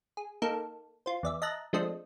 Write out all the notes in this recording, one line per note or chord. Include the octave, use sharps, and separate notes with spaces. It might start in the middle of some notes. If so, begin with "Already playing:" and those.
G#4
A#3 D#4 A4
F4 C5
E2 D5 E5
D#5 E5 A5 A#5 F#6
F3 G#3 A3 C4 D4 D#5